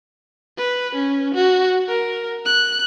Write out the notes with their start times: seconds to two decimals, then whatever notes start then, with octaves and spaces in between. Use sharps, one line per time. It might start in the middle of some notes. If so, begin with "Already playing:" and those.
0.58 B4
0.95 C#4
1.35 F#4
1.89 A#4
2.45 F#6